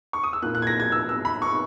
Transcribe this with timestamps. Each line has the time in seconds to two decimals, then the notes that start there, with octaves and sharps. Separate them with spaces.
0.13 C#6
0.24 D#6
0.33 E6
0.42 A#2 A#3 E4 F#6
0.55 F#6
0.62 G#6
0.67 A#6
0.80 G#6
0.92 E6
1.09 E6
1.25 B5
1.42 C#6